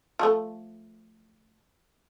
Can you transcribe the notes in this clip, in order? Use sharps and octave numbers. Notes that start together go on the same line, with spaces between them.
F3 A3